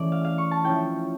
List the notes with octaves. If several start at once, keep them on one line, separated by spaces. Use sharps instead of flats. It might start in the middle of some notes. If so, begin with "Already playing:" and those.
Already playing: E3 A3 C#4 D5
F5
F5
C#6
A5
F3 C#4 E4 G5